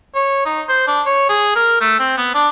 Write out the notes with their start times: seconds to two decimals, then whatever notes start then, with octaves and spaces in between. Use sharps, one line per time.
0.15 C#5
0.45 D#4
0.69 C5
0.87 D4
1.06 C#5
1.29 G#4
1.55 A#4
1.81 A3
1.99 C4
2.18 B3
2.35 D4